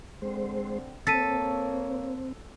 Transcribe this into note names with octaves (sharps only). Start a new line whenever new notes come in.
D3 G#3 C4 C5
A#3 C4 A4 C#5 A6 B6 D#7